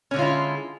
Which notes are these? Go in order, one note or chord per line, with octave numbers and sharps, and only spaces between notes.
D3 G#3 C#4 E4 F4